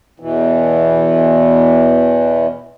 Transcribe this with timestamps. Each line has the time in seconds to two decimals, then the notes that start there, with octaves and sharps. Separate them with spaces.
0.20 E2 B2 E3